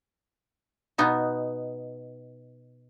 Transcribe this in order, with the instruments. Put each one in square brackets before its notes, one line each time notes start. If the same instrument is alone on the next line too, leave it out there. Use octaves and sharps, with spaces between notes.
[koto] B2 B3 D#4 F#4